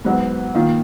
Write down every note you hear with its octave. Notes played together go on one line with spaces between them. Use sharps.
G#2 F#3 B3
D#3 A#3 F4